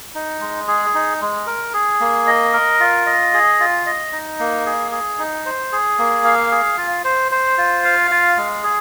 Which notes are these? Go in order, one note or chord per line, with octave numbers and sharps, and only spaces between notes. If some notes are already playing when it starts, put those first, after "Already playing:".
D#4
G#3
G#4
D#4
G#3
A#4
G#4
A#3
D#5
A#4
F4
D#5
G#4
F4
D#5
D#4
A#3
G#4
G#4
D#4
C5
G#4
A#3
F5
G#4
F4
C5
C5
F4
F5
F4
G#3
G#4